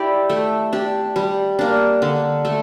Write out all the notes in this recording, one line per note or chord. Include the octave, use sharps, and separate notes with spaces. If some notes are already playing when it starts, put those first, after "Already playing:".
Already playing: E4 G4 D5
A3
D4 G4
G3
A#3 D4
D3
A3